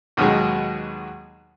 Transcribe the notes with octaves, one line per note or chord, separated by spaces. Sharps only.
D#2 B2 D#3 F#3 G#3